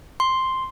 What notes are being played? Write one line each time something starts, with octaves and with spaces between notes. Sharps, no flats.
C6